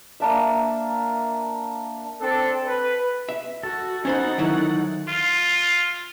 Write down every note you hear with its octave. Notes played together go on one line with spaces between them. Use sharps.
A#3 D4 E5
C4 D4 A4
B4
E5
F#4 A4
C#4 D#4 C5 F#5 B5
D2 D#3 F#3 E4
F4